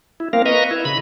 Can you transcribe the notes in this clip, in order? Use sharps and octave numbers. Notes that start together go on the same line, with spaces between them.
E4
A#3 C4 A#4 F5
B4 D#5 A#5 C#6
E4
C#3 B5